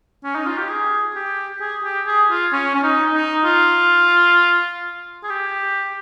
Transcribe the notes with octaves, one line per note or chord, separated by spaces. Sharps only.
C#4
D#4
F4
G4
G#4
G4
G#4
G4
G#4
F4
C#4
C#4
D#4
D#4
F4
G#4
G4